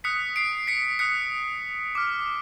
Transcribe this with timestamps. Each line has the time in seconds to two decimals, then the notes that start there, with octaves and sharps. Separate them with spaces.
0.04 D#6 F#6 B6 C#7
0.36 C7 D7
0.67 B6 C#7
0.99 D#6 F#6 B6 C#7
1.95 D6 F6